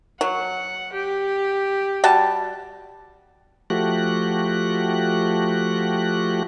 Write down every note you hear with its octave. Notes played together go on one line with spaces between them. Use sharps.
F#3 F#5
G4
G3 F#4 A5
F3 A3 F#4 G4 F#6